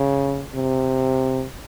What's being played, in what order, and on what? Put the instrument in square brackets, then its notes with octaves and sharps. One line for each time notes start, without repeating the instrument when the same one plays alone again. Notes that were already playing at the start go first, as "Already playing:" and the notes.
Already playing: [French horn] C#3
C3